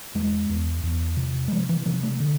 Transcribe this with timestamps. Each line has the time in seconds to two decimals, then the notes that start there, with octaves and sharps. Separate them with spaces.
0.15 E2 G#3
0.49 E2
0.83 E2
1.17 C3
1.48 G#3
1.52 C3 F3
1.69 E3
1.86 C3 F3
2.03 A3
2.20 D3